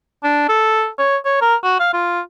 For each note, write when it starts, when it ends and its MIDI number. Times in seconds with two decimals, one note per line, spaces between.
0.24 0.48 62
0.49 0.88 69
0.99 1.17 73
1.25 1.37 73
1.42 1.55 70
1.64 1.77 66
1.80 1.89 77
1.93 2.20 65